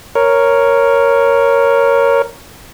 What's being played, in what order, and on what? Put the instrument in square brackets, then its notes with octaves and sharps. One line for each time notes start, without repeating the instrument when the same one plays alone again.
[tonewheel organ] A#4 C#5